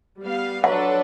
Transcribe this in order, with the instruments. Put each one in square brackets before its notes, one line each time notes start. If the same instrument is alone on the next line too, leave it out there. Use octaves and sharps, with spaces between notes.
[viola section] G3 B3 F5
[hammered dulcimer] F3 F#3 [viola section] D4 A4 B4 [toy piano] F#5